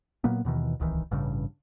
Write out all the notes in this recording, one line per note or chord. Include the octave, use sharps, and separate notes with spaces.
A#2 F#3 A#3 B3
D#2 B2 D#3 E3
D1 C2 D#3 E3
A1 G2 C#3